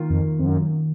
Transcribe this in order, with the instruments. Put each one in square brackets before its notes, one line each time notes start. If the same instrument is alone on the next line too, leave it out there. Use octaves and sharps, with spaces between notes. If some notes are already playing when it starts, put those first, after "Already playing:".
Already playing: [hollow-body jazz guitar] D#3 A#3 F4 A#4
[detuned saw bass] F2
F2
F#2